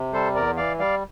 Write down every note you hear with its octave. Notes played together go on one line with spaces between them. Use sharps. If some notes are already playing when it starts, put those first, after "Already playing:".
Already playing: C3
G3 A4 C5
E2 A#4 D5
E3 D5 F5
G3 D5 F5